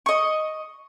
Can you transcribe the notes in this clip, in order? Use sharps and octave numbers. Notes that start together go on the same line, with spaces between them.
D#5 C#6